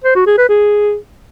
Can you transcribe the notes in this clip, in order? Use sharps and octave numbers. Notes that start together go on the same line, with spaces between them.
C5
F#4
G#4
B4
G#4